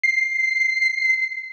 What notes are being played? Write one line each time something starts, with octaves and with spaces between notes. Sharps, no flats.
C7